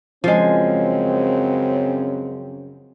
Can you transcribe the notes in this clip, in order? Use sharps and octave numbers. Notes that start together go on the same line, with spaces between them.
F#2 C#3 F3 G#3 C4